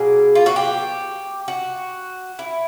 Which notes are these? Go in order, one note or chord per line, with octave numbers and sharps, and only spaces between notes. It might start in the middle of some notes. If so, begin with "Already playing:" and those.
Already playing: B2 F#3 A#3 G#4
F4
F#4
G4
F#4
E4